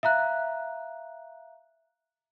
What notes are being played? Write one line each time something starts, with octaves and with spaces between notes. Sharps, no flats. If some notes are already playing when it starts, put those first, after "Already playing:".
E5 F5 A#5 F#6